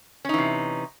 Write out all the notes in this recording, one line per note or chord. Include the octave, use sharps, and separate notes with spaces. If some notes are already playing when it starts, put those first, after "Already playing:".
C3 E3 C#4 D#4